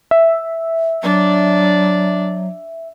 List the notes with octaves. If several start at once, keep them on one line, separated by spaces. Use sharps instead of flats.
E5
F#3 D4 D5